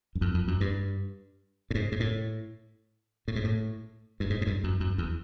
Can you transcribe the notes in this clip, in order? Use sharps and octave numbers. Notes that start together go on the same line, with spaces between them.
F#2
F2
F2
F#2
G2
A2
G#2
G#2
A2
A2
G#2
A2
G2
G#2
G#2
G2
F#2
F#2
E2